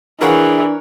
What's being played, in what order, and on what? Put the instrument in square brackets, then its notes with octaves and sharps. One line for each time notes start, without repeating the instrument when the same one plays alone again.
[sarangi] E3 [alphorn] D4 [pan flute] G#4 [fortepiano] A#4 C#5 F#5